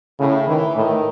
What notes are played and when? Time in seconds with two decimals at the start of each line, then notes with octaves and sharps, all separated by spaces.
0.20 A2 C#3
0.48 D#3 E3
0.76 A2 D#3